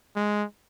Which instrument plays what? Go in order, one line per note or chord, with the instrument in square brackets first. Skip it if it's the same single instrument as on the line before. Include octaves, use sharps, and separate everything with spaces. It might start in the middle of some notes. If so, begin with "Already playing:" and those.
[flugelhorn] G#3